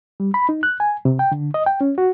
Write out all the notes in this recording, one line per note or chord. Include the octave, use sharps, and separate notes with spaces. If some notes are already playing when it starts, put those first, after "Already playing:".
G3
B5
D#4
F#6
G#5
C3
G5
D3
D#5
G5
C#4
F#4